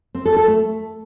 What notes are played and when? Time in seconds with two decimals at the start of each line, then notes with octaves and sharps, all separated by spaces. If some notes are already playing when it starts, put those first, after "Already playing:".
0.15 C4
0.25 A4
0.36 A4
0.47 A3